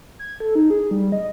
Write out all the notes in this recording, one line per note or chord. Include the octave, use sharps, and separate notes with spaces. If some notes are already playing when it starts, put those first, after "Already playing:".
G#6
A4
D#4
G#4
G3
D#5